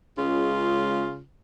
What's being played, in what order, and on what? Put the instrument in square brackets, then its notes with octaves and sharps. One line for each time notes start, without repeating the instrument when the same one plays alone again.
[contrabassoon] C#2 [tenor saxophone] C#3 [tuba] G#3 [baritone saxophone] F4